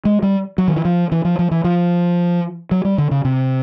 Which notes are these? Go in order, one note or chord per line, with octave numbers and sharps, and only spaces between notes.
G#3
G3
F#3
D#3
E3
F3
E3
F3
F3
E3
F3
F#3
G3
D3
C#3
C3